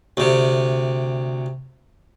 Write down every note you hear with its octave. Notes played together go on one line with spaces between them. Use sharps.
D2 C3